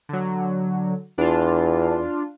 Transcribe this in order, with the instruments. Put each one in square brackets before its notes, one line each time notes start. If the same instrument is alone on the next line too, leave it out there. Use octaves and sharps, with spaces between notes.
[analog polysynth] D3 F#3
[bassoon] E2 [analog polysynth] D4 F4